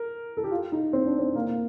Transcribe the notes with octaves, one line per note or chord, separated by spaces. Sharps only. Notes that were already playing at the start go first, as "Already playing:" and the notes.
Already playing: A#4
A4
G4
F4
D#4
C4
D4
C4
A#3
A#3